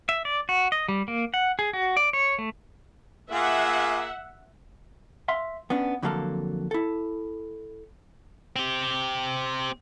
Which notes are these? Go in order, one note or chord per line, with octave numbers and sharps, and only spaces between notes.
E5
D5
F#4
D#5
G3
A#3
F#5
G#4
F#4
D5
C#5
A3
A#3 F4 G#4 E5 F#5
E5 F5 C6
B3 C#4 D4
F2 D3 F#3 A#3 A4 F5
E4 A4
C4 G4